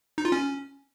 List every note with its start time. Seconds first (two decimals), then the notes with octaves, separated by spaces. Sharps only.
0.18 D#4
0.25 F4
0.32 C#4